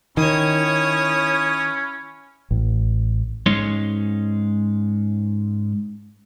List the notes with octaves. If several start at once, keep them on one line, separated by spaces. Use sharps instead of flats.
D#3 C#4 E4 C#5 D#6
A1
G#2 G#3 C#4 D#4 C#5 C6